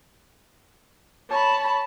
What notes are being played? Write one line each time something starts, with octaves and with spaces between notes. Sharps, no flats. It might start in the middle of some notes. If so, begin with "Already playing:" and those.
C#5 A5 B5